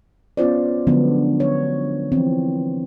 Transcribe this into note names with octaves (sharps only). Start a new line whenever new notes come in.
B3 C#4 F4 C5 D5
D3 F3 F#3 G#3 B3 D4
C#5
E3 F3 C4